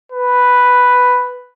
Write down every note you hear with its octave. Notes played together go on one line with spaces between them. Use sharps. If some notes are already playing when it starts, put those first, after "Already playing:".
B4